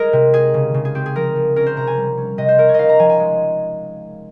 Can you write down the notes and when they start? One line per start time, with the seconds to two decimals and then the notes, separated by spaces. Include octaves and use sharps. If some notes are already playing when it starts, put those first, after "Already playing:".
Already playing: G#3 G#4 A#4
0.13 C3
0.33 D#4 G#4
0.54 C#3
0.74 C#3
0.85 G#4
0.95 C4 G4
1.06 G#4
1.15 F3 A#4
1.36 F3
1.56 C#4 A#4
1.66 C5
1.77 C3 A#5
1.87 G#5
1.97 G3
2.17 C#4
2.38 C3 D#5
2.49 C5
2.58 C#4 A#4
2.69 C#5
2.74 D#4 D#5 F5
2.89 A#5
2.99 F3 G#5
3.09 G#5
3.20 G#3